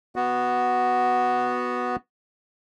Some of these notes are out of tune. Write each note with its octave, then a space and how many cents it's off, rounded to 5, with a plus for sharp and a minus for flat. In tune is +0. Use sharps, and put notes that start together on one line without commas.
B3 +0 F#4 +0